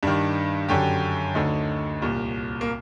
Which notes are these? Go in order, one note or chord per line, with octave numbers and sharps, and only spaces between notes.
G2 D#3 D4
F#2 D3 G4
D2 D3 D#4
C2 A#2
A#3